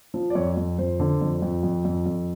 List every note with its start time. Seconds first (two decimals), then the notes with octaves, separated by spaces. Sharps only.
0.14 F3
0.30 D5
0.35 F2 C#5
0.57 F2
0.79 F2 C5
1.00 D3
1.21 F2
1.42 F2
1.63 F2
1.85 F2
2.06 F2